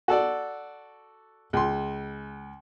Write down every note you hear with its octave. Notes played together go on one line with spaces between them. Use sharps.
F#4 A4 D5
C#2 C6